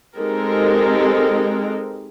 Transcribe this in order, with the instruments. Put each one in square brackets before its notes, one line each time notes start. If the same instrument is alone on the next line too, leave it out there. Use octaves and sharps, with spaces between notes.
[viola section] G#3 C4 D#4 G4 A4 A#4